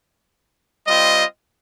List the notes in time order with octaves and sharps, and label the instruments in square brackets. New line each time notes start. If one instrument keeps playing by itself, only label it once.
[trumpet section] G3 C4 F4 D#5